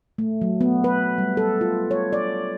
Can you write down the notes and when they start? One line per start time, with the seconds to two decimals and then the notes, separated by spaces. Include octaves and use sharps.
0.18 A3
0.42 F#3
0.61 B3
0.84 B4
1.18 G3
1.37 A4
1.61 F4
1.91 C#5
2.13 D5